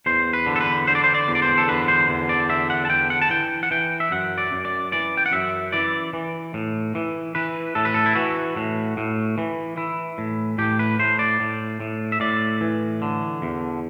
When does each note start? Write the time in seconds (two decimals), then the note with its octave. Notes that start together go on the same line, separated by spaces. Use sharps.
0.06 E2 C5
0.33 B4
0.46 D3
0.56 A4
0.61 B4
0.87 D3 C5
0.95 D5
1.04 C5
1.15 D5
1.28 E2
1.35 D5
1.42 C5
1.58 A4
1.68 D3 B4
1.88 C5
2.09 E2
2.29 D5
2.49 D3 E5
2.70 F#5
2.85 A5
2.90 E2 G5
3.10 F#5
3.22 A5
3.30 E3 G5
3.63 F#5
3.71 E3 G5
4.00 E5
4.11 F#2 F#5
4.38 D5
4.52 F#2
4.65 D5
4.92 E3 D5
5.17 G5
5.26 F#5
5.32 F#2 E5
5.72 E3 D5
6.13 E3
6.54 A2
6.95 E3
7.35 E3 B4
7.75 A2 A4
7.85 B4
7.94 A4
8.06 E4
8.15 E3 F#4
8.57 A2
8.97 A2
9.38 E3
9.77 E3 E4
10.18 A2
10.58 A2 G4
10.79 B4
10.99 A2 C5
11.19 D5
11.40 A2
11.80 A2
12.12 E5
12.20 A2 D5
12.61 E3
13.02 D3
13.42 E2